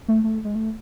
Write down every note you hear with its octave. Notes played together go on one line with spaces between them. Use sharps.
A3
A3
G#3
A3